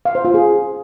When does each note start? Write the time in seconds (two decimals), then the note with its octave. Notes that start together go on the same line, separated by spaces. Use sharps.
0.05 F5
0.15 C5
0.25 F4
0.34 G#4